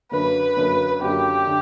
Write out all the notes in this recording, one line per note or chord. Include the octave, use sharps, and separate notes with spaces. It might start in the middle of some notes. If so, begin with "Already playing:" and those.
F#2 D3 A#3 B4
F#2 D3 A#3
F#2 D3 A#3 G4
D3